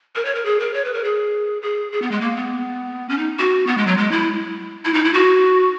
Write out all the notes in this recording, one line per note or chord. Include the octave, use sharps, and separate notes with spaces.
A#4
C#5
A#4
G#4
A#4
C#5
B4
A#4
G#4
G#4
G#4
B3
G#3
A#3
B3
C#4
D#4
F#4
B3
G#3
F#3
G#3
E4
E4
D#4
E4
F#4